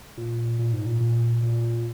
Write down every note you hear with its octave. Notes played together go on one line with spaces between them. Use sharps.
A#2
A#2
G#2
A#2
A#2
A#2